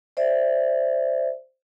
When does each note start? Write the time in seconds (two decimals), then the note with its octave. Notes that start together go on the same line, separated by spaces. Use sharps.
0.17 C5 D5 E5